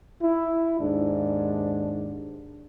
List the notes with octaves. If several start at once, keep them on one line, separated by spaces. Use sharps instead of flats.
E4
D#2 G#2 D4